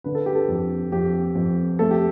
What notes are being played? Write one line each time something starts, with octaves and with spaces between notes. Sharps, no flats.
D3 B4
A4
G4
A4
F2
F2 G4
F2
A3 A4
G4